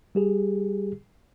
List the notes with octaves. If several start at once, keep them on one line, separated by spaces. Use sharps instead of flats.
G3 G4 G#4